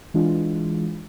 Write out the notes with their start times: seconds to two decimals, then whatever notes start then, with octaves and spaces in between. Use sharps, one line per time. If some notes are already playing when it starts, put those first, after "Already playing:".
0.14 E3 G#3 D4 F4